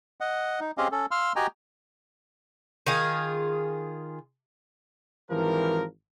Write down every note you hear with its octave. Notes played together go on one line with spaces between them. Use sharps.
D#5 F#5
D#4
C4 C#4 G4 G#4 D#5 F5
C#4 A4
F5 C6 E6 F6
F#4 G4 D#5 G5 G#5 A#5
D#3 F4 G#4
G#1 E3 F3 G4 A#4